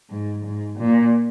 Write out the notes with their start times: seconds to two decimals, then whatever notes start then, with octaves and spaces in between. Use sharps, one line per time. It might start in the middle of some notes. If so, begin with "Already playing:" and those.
0.10 G#2
0.46 G#2
0.79 A#2